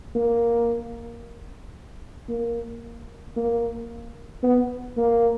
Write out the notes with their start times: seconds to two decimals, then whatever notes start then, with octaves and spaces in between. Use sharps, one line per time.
0.15 A#3
2.29 A#3
3.37 A#3
4.43 B3
4.97 A#3